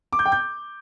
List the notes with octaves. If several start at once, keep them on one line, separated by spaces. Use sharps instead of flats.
D6
G6
G5
G6